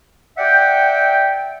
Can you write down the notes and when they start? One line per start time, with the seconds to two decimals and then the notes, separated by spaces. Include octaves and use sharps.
0.37 D5 E5 F#5 G5